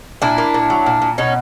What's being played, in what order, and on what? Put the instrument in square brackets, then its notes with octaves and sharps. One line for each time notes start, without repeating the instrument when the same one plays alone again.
[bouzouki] A#2 D4 E4
A#3
A#2
F#3
A#2
A#2
B2 C#4 D#4